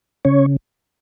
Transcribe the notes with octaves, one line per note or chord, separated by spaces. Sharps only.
C#3 C#4 C#5